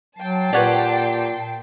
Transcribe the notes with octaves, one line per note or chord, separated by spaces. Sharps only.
F#3 G5 A5 C7
A#2 G4 B4 C#5 D5 F#5